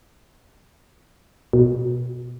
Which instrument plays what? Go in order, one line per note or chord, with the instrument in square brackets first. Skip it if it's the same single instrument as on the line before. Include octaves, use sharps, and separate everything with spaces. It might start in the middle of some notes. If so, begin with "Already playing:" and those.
[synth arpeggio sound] B2